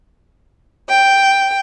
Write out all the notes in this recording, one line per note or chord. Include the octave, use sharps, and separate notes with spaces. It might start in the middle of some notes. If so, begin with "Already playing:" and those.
G5